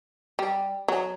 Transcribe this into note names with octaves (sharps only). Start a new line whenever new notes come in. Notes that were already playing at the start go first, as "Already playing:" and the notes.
G3
F#3